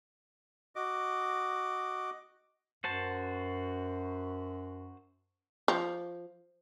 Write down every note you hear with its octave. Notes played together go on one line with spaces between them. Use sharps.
F#4 D#5 D6
F#2 F#4 C5 A5
F3